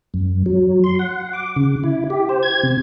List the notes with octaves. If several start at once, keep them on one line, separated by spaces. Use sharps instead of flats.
F#2
F#3
C6
F#5
D6
C#3
E4
G4
C5
G#6
C3